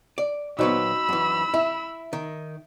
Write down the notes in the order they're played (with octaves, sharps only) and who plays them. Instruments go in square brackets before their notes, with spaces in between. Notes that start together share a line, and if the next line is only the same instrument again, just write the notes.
[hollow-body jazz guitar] D5
[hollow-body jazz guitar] A#2 F#3 B3 [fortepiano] D#4 F#4 C5 [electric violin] B5 E6
[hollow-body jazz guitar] F#2 E3
[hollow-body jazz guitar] E4 [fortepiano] E5
[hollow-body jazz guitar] D#3